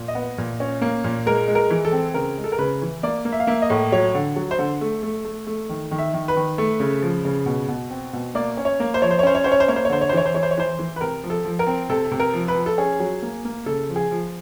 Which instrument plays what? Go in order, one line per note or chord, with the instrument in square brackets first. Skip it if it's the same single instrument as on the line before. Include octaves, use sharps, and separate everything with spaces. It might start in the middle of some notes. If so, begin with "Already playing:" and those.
Already playing: [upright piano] A#2
D#5
B3
A#2
C#4
A#3
A#2
G#3 A#4
G#3
A#4
E3
A4
C4
C#3 A#4
G#3
A4
A#4
C#3 B4
E3
A#3 D5
A#3
E5
F5
A#3 E5
D#5
A2
F#3 C#5
D3
F#3
C5
D3
A3
A3
A3
A3
D#3
D#3
E5
D#3
B4
D#3
A3
C#3
F3
C#3
B2
B2
C4
B2
A#3 D5
C#4
C#5
A#3
C5
F3 C#5
C5
C#5
C#4 C5
C#5
C#4 C5
C#5
C5
A#3 C#5
C5
C#5
D3 C5
C#5
C5
E3 C#5
C5
E3 C#5
C5
C#5
E3 C5
E3
B4
C3 A#4
F3
A4
F3
A#4
C4
C3 A4
C3
A#4
F3
B4
F3
A4
C#4 G#4
F#3
A#3
A#3
C#3 A4
F3
G#4
F3